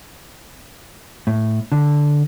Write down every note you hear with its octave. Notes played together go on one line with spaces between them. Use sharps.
A2
D3